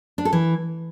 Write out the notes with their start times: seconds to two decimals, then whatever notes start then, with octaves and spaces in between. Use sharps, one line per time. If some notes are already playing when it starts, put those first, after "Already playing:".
0.18 D4
0.25 A4
0.33 E3